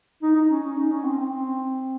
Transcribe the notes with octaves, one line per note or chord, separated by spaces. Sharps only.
D#4
D#4
C#4
C#4
D#4
C#4
C4
C4
C4